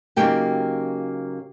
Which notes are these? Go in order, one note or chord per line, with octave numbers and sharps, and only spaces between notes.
C#3 F#3 A#3 D#4 G4 G5